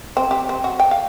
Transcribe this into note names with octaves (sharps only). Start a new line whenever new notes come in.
C4
G4
C4
F#4
G5
F5